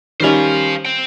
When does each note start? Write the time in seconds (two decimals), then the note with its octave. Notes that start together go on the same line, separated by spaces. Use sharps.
0.20 D#3 G3 C#4 C5 F5
0.85 C5 G5